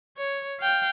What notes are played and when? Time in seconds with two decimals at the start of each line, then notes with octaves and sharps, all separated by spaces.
0.18 C#5
0.60 F5 G5